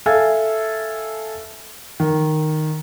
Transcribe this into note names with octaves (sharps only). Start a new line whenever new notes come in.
A4 E5 F5 G#5
D#3